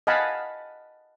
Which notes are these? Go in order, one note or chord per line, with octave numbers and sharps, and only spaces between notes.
D#5 F5 F#5 G#5 A5 B5